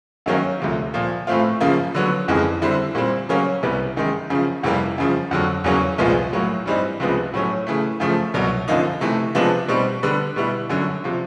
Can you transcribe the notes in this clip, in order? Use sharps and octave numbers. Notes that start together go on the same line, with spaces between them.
F#2 D#3 F#3 A#3 C#4
D2 C3 F3
A#2 F3 A#3
A2 E3 A3 C4 F4
F#2 C#3 F3 A#3
D3 F#3 B3
F2 C#3 E3 G#3
D3 G3 C4 E4
A#2 G3 C4
C#3 F#3 A#3 C#4
C2 C3 E3 G3 B3
F#2 D#3 G#3
F#2 C#3 F3
F2 C3 E3 G3 A#3
F#2 C#3 F3
F2 D3 F#3
E2 C#3 F#3 A#3 C#4
C2 A#2 F3 G#3 B3
A2 F#3 A#3
G2 E3 G3 C4 D#4
C#2 C3 F3 G#3 B3
A2 F#3 A3 C#4
C#3 E3 A3
F#2 C#3 F3 A3
C2 B2 F#3
F#2 D3 F3 A#3 D#4
C3 E3 A3
C3 F3 G#3 B3 D4
B2 G3 C4 D#4
D3 G3 B3
B2 G3 B3 E4
F#2 D3 F#3
C3 F3